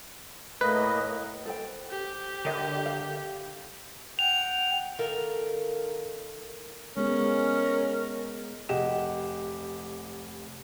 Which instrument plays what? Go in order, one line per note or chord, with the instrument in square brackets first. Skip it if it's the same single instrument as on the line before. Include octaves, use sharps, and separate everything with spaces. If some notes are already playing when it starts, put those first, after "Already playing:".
[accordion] A2 A#3 D#5 [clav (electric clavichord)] B4
[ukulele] A4 C5 G5
[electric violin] G4
[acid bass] D3 [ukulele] A#4 D#5
[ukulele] F5
[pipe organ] F#5 G5 [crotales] F7
[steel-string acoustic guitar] D#3 A4 A#4 F5
[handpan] G#3 B3 G#4 [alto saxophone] C#4 [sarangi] A#4
[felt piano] F1 G4 D#5 F#5 E7